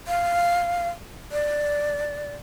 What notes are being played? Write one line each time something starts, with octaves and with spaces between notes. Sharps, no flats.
F5
D5